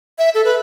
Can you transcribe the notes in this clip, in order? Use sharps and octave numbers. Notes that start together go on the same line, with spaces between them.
E5
A4
B4